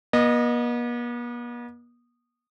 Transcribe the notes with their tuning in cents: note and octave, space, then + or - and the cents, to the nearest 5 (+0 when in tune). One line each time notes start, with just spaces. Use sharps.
B3 -45 D#5 -15